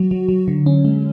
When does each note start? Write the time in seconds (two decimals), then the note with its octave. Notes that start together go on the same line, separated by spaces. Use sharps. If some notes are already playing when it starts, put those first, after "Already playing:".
Already playing: F#3 F#4
0.11 F#3
0.29 F#3
0.48 D3
0.66 C#4
0.85 G#3